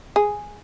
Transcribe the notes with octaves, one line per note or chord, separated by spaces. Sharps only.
G#4